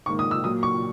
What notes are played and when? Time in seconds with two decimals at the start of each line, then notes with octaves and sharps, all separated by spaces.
0.06 G#2 D#3 A#3 C#6
0.19 D#6
0.31 E6
0.44 A#2 F#3 A#3 D#6
0.63 C#6